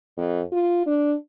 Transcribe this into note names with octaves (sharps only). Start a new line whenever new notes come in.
F2
F4
D4